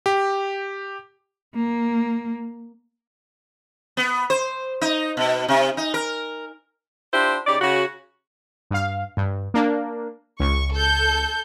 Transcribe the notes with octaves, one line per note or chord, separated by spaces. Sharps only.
G4
A#3
B3
C5
D#4
B2
C3
D#4
A#4
D4 E4 F4 G4 C5
C#3 D#4 G4 D5
C#3 F#4
G2 F5
G2
A#3 D4
C#2 C#6
A4 G6